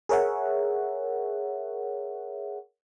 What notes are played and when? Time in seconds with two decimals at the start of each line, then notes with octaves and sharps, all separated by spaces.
0.09 G#4 A#4 C#5 E5 F#5